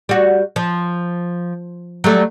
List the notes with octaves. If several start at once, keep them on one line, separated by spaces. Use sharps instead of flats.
G3 F#4
F3
F#3 G3 A3